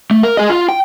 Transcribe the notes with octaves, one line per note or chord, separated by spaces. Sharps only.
A3
A#4
G#4 D#5
F4
G5